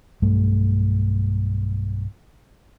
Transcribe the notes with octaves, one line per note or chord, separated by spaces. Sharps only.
B1 G2 G3 A3